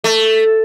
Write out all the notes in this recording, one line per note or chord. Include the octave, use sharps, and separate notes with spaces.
A3